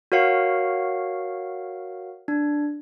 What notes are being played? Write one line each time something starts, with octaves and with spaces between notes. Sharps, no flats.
F#4 A#4 C#5 F5 F#5
D4